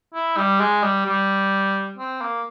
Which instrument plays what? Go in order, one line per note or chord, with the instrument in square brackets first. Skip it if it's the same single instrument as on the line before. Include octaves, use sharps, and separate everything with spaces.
[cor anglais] E4
G3
G#3
G3
G3
C4
A#3